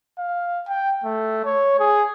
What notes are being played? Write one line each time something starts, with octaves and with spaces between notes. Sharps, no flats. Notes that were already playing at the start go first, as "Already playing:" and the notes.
F5
G5
A3
C#5
G#4